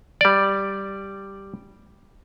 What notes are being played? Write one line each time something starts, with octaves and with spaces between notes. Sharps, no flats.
G3 D5